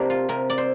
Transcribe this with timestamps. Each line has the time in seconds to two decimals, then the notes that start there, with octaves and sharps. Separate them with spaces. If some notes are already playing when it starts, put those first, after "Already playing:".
Already playing: C3 G3 A#3 D4
0.10 F4
0.29 C3 A#4
0.50 D5
0.58 C5